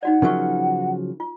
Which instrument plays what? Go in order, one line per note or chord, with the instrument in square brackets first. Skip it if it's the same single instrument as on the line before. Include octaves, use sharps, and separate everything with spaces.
[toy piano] D#4 F#4 D5 [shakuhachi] F#5
[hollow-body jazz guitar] C#3 F3 F#3 [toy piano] A#4 E5 C#6
[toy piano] F4